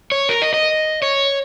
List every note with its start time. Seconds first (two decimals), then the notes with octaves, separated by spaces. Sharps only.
0.12 C#5
0.29 A#4
0.42 D#5
0.54 D#5
1.02 C#5